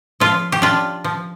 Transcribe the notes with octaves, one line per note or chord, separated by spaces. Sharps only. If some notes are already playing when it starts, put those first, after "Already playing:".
F3 F4
G4
D4 F4
F3